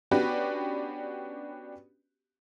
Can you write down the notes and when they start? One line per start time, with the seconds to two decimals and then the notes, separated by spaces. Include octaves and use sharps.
0.11 B3 C#4 D4 F#4 G4 B4